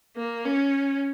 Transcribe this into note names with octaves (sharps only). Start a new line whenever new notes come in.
A#3
C#4